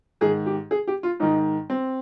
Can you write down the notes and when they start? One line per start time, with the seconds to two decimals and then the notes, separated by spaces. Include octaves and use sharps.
0.21 G#2 G#4
0.24 D#3
0.46 G4
0.71 G#4
0.87 G4
1.03 F4
1.20 G#2 D#3 D#4
1.70 C4